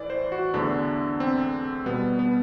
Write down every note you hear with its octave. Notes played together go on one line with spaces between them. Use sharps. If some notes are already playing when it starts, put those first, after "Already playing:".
Already playing: A2 E3 D5
C5
F#4
E2 D3 A3 D4
C4
B2 G3 B3
B3